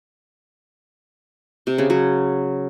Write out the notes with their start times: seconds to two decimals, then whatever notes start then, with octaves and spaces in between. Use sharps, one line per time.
1.67 C3
1.78 C#3
1.90 F#3